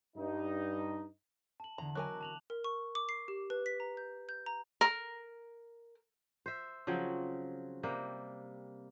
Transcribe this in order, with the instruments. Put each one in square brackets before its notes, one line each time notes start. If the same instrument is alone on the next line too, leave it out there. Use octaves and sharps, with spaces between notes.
[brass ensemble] G2 D#4
[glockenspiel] A5 F#7
[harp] E2 D3 [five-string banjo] A#5
[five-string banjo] F#3 A#4 G#5 [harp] D#5 [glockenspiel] A5 D6 F#6
[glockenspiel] A5 F7 F#7
[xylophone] A#4
C#6
D6
C7
G4
B4
B6
A#5
G6
G6
A#5
[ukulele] A#4
[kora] C5 E5
C#3 F3 F#3 C4
C3 G3 A#3